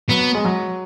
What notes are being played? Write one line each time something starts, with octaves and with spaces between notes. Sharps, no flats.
F#3 B3
G#3
F#3